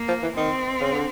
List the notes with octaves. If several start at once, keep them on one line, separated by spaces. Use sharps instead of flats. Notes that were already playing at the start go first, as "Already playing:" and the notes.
Already playing: A#3
F3
E3
D#3 C4
C#3
D3